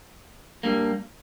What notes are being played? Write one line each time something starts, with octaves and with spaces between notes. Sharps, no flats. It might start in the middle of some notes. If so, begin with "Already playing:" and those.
G2 G3 A#3